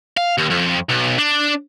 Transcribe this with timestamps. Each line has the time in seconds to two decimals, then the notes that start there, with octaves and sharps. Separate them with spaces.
0.17 F5
0.38 D#2
0.51 F2
0.90 B1
1.19 D4